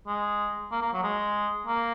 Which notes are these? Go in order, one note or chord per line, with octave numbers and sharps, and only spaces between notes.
G#3
A#3
A#3
F#3
G#3
A#3